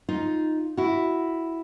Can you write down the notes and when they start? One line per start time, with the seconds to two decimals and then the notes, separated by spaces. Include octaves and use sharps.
0.09 D#4 F4
0.77 E4 F#4